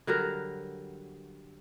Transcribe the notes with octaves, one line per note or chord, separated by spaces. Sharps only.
D3 F#3 G3 A#4